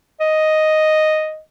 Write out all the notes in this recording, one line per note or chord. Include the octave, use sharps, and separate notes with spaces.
D#5